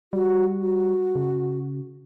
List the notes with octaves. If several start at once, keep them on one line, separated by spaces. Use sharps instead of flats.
G3 F#4
F#4
C#3